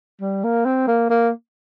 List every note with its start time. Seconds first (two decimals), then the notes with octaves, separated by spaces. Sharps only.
0.21 G3
0.44 A#3
0.65 C4
0.88 A#3
1.10 A#3